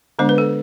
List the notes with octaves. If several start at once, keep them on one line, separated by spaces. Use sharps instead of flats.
D3 G#3 B3 D4 C5
B4
A4